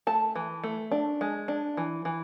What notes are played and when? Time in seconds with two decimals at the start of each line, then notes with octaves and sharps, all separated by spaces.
0.07 A3 A5
0.36 E3
0.64 A3
0.91 D4
1.21 G#3
1.48 D4
1.77 E3
2.05 E3